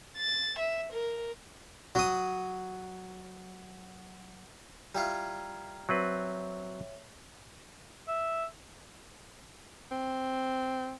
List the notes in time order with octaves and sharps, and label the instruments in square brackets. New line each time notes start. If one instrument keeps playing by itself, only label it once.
[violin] A6
E5
A#4
[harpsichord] F#3 D#6
[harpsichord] G3 E4 F4 [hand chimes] A#5 G#6
[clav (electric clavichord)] F#3 C4 B4 [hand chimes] C#5 E5
[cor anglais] E5
[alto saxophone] C4